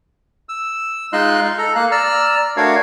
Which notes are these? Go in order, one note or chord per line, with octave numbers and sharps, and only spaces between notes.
E6
G#3 D#4 F4 D#5 C6 F#6
A4 A#5
A#3 F5 F#6
D5 A#5 E6 F6
A3 D4 F#4 A#4 C#5 F5